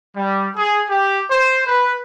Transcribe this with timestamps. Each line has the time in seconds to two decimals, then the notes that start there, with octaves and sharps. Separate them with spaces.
0.16 G3
0.57 G#4
0.89 G4
1.30 C5
1.67 B4